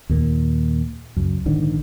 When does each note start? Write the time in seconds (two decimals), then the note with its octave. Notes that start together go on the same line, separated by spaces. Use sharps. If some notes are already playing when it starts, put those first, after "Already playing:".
0.09 D#2 A#2
1.17 C#2 F#2
1.45 A#1 G#2 D3 D#3